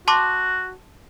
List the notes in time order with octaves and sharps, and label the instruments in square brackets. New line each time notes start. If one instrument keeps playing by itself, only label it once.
[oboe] F#4 [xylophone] A5 C6 D6